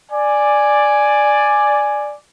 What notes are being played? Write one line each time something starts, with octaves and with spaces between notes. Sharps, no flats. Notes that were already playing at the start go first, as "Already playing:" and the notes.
D5 G#5